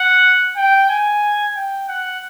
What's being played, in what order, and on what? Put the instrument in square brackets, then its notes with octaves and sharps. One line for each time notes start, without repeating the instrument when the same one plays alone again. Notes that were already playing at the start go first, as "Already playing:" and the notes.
Already playing: [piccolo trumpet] F#5
G5
G#5
G5
F#5